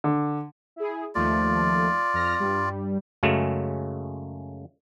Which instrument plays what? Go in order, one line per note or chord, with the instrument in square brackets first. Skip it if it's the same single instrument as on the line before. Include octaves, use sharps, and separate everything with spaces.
[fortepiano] D3
[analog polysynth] E4 G#4
[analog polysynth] D#2 F3 A3 [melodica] F4 D5
[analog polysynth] F2 F6 A#6
G2 G3
[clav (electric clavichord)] F#2 C#3 F#3 G#3 A3